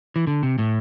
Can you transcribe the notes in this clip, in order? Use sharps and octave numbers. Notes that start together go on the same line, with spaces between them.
E3
D3
C3
A2